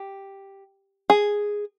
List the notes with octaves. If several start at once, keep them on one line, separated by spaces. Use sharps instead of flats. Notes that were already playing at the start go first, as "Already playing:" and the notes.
Already playing: G4
G#4